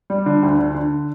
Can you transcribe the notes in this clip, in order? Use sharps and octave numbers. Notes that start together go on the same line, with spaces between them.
G3
D3
D2
D3
D3